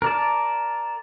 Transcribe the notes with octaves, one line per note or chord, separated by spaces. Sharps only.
A#4 D5 A5